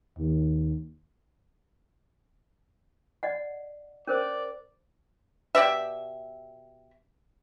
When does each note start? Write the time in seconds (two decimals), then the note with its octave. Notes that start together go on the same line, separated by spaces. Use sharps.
0.18 D#2
3.23 D5 D#5 F#5
4.07 C#4 A#4 C5 D5
5.55 B2 G4 D5 E5